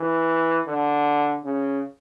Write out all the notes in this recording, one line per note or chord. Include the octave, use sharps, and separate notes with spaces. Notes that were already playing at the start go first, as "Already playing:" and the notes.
Already playing: E3
D3
C#3